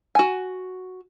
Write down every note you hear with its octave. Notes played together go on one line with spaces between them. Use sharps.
F#4 G#5